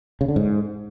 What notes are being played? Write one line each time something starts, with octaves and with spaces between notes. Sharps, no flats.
C#3
D3
G#2